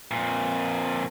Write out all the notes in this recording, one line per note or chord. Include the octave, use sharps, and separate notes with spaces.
F2 A#2